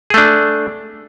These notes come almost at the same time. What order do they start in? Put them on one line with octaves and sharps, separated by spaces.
G#4 A3 D4